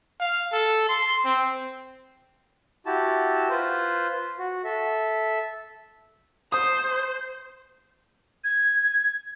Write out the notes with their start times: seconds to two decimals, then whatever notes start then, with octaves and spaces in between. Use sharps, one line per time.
0.20 F5
0.52 A4
0.88 C6
1.25 C4
2.86 E4 F#4 G4 A5
3.50 F4 B4 C5
4.39 F#4
4.64 A4 E5
6.52 C5 D#6
8.44 G#6